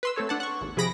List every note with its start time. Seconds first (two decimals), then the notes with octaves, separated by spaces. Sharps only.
0.03 B4 C6 E6
0.16 A3 C4 A4 C#5
0.29 D4 F#5 A5
0.40 F#5 C#6
0.61 G#1 D#2
0.77 C3 F3 G#4 B5 A#6 D7